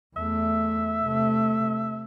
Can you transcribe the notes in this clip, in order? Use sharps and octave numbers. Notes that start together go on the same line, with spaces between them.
E2 A3 E5
C3 A3